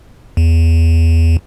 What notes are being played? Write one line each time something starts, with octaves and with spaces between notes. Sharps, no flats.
E2